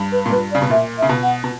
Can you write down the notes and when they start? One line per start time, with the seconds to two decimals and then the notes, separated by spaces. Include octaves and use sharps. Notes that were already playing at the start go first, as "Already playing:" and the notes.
Already playing: G2
0.11 B4
0.26 A#2
0.30 G2 B4
0.50 D5
0.55 C#3
0.62 B2
0.70 A#2 E5
0.97 E5
1.02 C#3
1.09 B2
1.22 F#5
1.44 B2